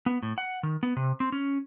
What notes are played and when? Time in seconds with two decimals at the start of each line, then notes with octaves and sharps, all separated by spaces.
0.06 B3
0.23 A2
0.38 F#5
0.63 D#3
0.83 B3
0.97 C3
1.20 C4
1.32 C#4